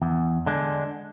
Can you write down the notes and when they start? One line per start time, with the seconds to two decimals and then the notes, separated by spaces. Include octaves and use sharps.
0.02 E2
0.46 D3 G#3 D4